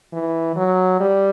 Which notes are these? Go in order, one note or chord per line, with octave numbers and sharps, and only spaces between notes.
E3
F#3
G3